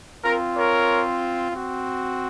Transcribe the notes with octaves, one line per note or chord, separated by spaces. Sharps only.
C4 F4 A#4
A#4 C#5
C4 F#4